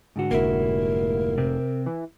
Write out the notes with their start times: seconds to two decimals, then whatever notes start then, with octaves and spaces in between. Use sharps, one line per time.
0.16 G#2 D3 F#4
0.31 F1 A#3 E4 A#4
1.38 C3 C4
1.86 E3